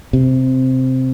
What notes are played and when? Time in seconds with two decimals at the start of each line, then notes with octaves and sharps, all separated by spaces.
0.13 C3